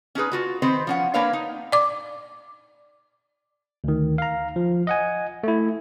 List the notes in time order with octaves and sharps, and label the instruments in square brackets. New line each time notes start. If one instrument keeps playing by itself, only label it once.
[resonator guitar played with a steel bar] C#4 D#4 G#4 B4
F4 F#4 B4
D#3 C4 B4 C5
F3 C#4 F#5
A#3 D4 A#4 B4 C#5 F5
D#4
[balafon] D5 D6
[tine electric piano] D2 D#3
F5 A#5
F3
D#5 F#5 G#5
A3 E4